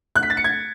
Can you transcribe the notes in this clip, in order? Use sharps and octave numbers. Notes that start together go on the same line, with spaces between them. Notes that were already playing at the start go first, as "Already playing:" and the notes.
F#6
B6
A6
C#7
G#6